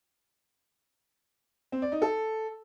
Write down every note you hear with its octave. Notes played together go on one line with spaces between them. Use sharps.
C4
D5
D#4
A4